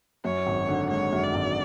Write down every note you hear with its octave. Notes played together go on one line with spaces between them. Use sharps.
F#2 C#5
G#1
D3
G#3 C#5
F#2
D5
G#1